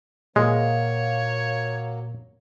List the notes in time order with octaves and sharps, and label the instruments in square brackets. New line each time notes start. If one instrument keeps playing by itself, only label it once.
[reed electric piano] A#2 A#4 F5 [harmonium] F#3 A#3 [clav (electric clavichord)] G#3 [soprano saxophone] C#5